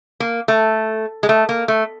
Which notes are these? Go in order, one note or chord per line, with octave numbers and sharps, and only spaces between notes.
A#3
A3
G#3
A3
A#3
A3